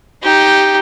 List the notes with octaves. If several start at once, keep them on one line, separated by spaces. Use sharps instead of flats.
D#4 G4